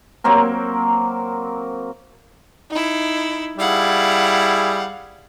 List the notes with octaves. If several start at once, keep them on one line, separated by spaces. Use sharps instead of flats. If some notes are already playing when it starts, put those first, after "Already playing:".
F#3 A#3 C4 A#4
D#4 E4
G3 E4 G#4 F5 F#5